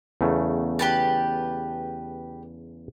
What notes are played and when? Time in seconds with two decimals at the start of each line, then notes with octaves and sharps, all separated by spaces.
0.21 E2 C#3 A3
0.79 G4 B4 A5